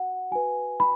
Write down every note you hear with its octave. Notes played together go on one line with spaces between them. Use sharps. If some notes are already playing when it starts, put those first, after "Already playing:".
Already playing: F#4 F#5
F#4 B4 G#5
B5